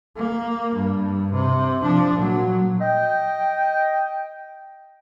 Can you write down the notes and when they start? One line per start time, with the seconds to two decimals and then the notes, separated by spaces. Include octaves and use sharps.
0.16 A#3
0.75 G2
1.33 C3
1.82 F3 D4
2.16 A#2 F#3
2.81 D#5 G5